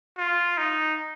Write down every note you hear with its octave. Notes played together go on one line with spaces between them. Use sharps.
F4
D#4